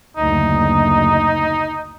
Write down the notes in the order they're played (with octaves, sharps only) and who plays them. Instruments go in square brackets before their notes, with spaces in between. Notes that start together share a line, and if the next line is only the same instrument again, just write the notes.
[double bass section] F#1 D2 [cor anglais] D#4